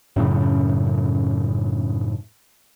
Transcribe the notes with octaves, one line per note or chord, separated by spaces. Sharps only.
F#2 A2 C#3